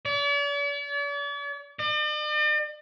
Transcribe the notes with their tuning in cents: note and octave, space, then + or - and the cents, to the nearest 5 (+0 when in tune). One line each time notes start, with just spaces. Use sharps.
D5 -45
D5 +45